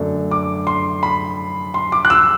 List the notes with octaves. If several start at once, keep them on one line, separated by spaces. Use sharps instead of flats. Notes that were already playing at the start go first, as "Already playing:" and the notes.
Already playing: F#2 D3 A3 D4
D6
C6
B5
C6
D6
F#6
E6